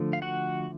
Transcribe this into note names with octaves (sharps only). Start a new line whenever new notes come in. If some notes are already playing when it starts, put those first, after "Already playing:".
Already playing: D3 F3 A3
F5
F#4 F#5